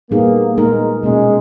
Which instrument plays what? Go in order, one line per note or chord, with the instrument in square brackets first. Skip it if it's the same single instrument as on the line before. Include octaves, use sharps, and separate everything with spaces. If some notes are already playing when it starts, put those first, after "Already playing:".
[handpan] A#2 G3 B3 D#4 G#4 [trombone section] A#3
[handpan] A#2 A#3 D#4 A#4 [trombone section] G#3
[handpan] B2 A#3 C#4 [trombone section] G#3